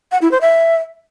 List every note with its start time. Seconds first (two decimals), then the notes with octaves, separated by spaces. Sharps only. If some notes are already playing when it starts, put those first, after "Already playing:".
0.12 F#5
0.22 E4
0.31 C5
0.41 E5